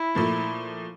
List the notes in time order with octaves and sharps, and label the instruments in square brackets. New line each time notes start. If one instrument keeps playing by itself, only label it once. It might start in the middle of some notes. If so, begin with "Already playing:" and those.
Already playing: [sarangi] E4
[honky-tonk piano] A#2 F3 A3